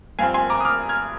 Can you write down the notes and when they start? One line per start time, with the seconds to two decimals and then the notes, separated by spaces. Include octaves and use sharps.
0.19 G2 F3 C4 F5 G#5
0.34 G#5 C6
0.50 A#5 D6
0.61 D#6
0.65 D6 F6
0.89 F6 G#6